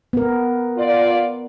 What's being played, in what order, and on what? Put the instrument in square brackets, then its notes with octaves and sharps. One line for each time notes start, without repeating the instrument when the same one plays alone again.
[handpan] B3 A#4
[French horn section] F4 D5